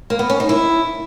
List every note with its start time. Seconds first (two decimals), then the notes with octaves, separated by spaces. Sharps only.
0.10 A#3
0.19 B3
0.30 C#4
0.40 D#4
0.49 E4